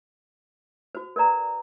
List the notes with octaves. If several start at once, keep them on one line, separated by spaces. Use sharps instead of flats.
F#4 C5
A#4 B4 D5 A#5